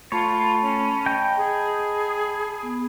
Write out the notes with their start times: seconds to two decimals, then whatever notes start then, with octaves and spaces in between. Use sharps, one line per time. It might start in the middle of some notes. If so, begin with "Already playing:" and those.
0.12 A3 F4 C#5 A5 B5
0.62 C#4
1.06 D#5 G5 G6
1.37 G#4
2.63 B3